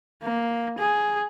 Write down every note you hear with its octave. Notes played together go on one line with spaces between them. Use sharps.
A#3
G#4